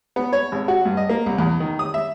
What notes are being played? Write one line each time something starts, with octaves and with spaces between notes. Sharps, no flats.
B3
C#5
G#1
F#4
G2
D#5
A#3
C2
E2
D#3
D#6
E5